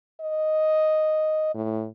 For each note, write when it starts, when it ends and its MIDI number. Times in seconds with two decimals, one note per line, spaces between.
0.21 1.51 75
1.55 1.87 45